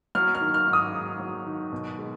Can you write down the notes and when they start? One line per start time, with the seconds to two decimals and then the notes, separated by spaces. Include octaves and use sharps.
0.15 F#3 F6
0.35 F6
0.41 D#3
0.54 F6
0.67 G#2
0.73 D#6
0.93 G#2
1.19 F#3
1.46 D#3
1.72 B2
1.98 G#3